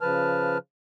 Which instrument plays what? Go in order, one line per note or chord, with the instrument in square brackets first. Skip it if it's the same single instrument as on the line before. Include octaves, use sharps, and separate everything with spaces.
[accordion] C#3 F3 B4 A5 F6